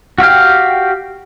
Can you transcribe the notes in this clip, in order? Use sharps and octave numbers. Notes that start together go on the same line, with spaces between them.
F#4 G4 F5 G5